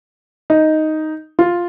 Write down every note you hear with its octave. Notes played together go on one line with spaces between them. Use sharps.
D#4
F4